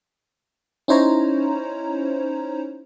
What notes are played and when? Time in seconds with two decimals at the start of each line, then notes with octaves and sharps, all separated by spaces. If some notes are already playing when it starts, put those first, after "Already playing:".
0.88 C#4 D#4 E4 C5 C#5 A#5